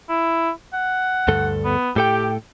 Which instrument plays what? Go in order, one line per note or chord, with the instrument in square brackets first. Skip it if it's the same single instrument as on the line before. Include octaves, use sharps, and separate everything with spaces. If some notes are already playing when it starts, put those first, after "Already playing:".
[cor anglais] E4
F#5
[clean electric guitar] D2 G2 A4
[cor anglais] B3
[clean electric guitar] A2 A4 G5 [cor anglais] G4